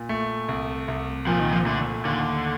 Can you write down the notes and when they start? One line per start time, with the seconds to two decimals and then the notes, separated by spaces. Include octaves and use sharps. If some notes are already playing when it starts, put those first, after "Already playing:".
Already playing: A#2
0.09 A3
0.49 C2
0.88 C2
1.27 A#2 F3
1.40 D#3
1.52 F3
1.66 D3 A3
2.05 D#2 D3